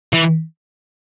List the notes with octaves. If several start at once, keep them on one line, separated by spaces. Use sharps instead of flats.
E3